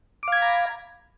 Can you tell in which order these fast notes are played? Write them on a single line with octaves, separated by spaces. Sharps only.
D6 F5 G#6 B5 A#5